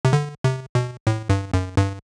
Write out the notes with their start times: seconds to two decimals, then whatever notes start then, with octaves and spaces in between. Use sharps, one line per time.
0.05 C3
0.13 D3
0.44 C3
0.75 B2
1.07 A2
1.30 G2
1.54 F#2
1.77 G2